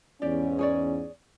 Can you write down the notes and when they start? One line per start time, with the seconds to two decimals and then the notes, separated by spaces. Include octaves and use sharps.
0.22 E2 G#2 C#4 G4 D5
0.59 G#4 C#5 D5